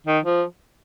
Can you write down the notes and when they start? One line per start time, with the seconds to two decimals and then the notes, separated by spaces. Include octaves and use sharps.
0.07 D#3
0.25 F3